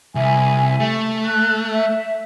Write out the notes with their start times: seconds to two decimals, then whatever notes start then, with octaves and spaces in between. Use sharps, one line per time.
0.15 C2 E5 G#5
0.80 A3
1.25 F#6
1.71 E5